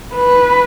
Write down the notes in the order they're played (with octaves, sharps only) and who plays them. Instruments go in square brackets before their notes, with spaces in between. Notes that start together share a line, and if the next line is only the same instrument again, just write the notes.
[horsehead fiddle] B4